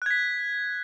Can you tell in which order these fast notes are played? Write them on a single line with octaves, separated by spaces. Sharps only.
F#6 G#6 B6